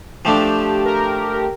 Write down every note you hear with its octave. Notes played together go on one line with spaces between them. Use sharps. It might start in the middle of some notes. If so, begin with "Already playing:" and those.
F3 A3 D4 G4
A#4
A#4
A#4